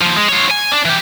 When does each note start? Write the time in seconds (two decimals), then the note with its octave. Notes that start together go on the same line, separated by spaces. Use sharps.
0.01 D#2 F3
0.17 G#3
0.29 F4 C#5
0.51 G#5
0.72 D4
0.85 E3 G4